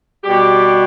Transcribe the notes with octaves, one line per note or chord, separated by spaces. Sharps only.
B2 G3 G4